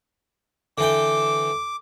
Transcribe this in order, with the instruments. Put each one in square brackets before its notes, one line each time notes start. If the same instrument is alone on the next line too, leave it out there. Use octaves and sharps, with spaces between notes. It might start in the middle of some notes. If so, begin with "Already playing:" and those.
[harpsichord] D3 E3 G5 [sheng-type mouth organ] D6